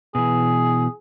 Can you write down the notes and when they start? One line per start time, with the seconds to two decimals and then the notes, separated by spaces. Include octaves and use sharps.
0.15 B2 E3 G#4